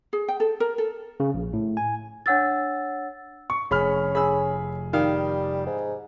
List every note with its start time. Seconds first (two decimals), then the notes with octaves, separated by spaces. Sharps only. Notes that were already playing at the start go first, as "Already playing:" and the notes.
0.13 G#4
0.28 G5
0.40 A4
0.60 A#4
0.78 A4
1.20 C#3
1.34 A#1
1.53 A2
1.77 G#5
2.26 D4 C#5 F#5 E6 A6
3.50 C#6
3.71 F1 C#4 G#4 B5 F6
4.15 G#4 B5 E6
4.93 D#3 G3 F5
5.66 G#2